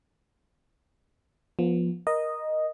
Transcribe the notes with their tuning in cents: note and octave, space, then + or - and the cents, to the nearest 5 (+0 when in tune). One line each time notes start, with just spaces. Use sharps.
F3 +0 B3 -30
A#4 +15 D#5 -5